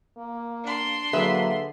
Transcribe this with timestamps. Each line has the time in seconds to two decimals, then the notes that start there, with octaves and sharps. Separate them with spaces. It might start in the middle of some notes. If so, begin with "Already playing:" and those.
0.17 A#3
0.64 D4 C6
1.13 D3 F#3 A#3 G#4 B4 E5